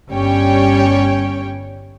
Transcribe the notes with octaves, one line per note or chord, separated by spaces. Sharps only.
G1 G3 C#4 C#5 G5